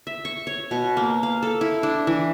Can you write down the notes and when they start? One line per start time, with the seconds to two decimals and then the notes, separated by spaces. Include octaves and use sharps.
0.07 E5
0.25 C#6
0.47 C#5
0.71 B2
0.97 A#3
1.23 F5
1.42 A4
1.61 E4
1.83 D4
2.07 E3